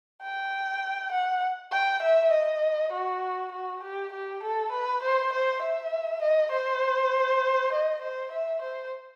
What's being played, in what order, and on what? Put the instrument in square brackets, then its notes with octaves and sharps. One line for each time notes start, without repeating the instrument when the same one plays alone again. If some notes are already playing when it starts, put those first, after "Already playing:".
[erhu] G5
F#5
G5
E5
D#5
F#4
F#4
G4
G4
A4
B4
C5
C5
E5
D#5
C5
D#5
C5
E5
C5